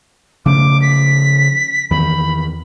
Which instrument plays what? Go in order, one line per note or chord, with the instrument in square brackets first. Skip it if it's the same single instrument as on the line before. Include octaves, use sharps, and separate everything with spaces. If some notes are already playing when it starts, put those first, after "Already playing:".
[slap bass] C#3 F3 A3 [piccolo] D6
[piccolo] B6
[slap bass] E2 D#3 [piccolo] B5